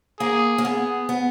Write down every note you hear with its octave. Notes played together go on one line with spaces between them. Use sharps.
A#3 G#4
A#3
B3 G#4
B3